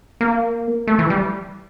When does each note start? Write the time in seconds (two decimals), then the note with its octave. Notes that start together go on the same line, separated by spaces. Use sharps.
0.21 A#3
0.87 A3
0.99 E3
1.10 G3